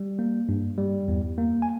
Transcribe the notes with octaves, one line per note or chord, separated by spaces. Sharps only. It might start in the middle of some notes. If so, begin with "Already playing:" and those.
Already playing: G3
A#3
G2
G3
E2
A#3
G#5